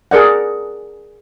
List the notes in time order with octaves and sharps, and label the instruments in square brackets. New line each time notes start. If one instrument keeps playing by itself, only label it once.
[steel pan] G#4 A#4 D5 F#5